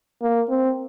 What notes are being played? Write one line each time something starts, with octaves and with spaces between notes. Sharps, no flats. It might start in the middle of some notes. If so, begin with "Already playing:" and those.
A#3
C4